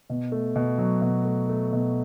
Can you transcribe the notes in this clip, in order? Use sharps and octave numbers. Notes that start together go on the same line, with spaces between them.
B2
A3
B2
F#3
B2
A3
A3
B2